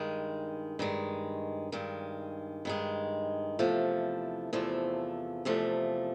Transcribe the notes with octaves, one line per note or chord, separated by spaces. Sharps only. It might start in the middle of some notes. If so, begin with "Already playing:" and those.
Already playing: G2 D#3 G#3
G2 D#3 G#3
G2 D#3 G#3
G2 D#3 G#3
E2 C3 F3 A3
E2 C3 F3 A3
E2 C3 F3 A3